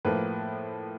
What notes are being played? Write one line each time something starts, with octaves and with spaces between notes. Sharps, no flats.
A2 F3 A#3 B4